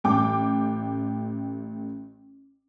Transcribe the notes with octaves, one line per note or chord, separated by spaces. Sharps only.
A1 G5 D6